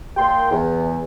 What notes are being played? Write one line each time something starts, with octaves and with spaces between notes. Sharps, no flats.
A#2 G5 C6
E2